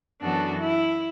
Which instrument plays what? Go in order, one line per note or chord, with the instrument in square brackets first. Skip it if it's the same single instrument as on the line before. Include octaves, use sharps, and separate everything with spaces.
[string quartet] F#2 E3 B3 F#4 A4 [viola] D4
[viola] E4